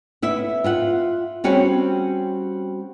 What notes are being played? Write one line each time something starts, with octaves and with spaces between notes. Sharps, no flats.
B3 E4 E5
F4 E5 F#5
G3 C4 C#4 F#4 G#4